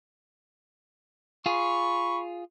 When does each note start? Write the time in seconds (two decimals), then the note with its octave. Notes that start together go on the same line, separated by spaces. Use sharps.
1.46 F4 G#4 B5 C#6